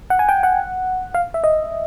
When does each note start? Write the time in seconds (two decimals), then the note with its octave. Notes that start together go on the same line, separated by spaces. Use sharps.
0.10 F#5
0.19 G#5
0.29 G5
0.43 F#5
1.14 F5
1.34 E5
1.44 D#5